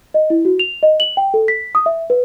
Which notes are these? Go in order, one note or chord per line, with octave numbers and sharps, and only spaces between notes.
D#5
E4
F#4
F7
D#5
F#7
G5
A4
B6
D#6
E5
B4